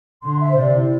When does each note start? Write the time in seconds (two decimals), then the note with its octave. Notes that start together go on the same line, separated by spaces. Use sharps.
0.23 D3 C6
0.40 E5
0.50 C5
0.57 C3 D5
0.75 E4